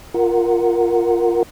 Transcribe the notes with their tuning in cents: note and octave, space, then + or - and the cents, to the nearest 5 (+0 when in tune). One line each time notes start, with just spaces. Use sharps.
F4 +0 A#4 +0 F#5 +0